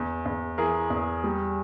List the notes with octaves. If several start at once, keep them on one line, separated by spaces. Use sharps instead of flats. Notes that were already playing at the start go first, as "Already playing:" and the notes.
Already playing: E2
E2
E3 G#4 A#4
E2
G3